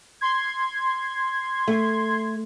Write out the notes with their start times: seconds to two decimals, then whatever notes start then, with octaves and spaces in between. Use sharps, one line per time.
0.21 C6 G#6
1.68 A3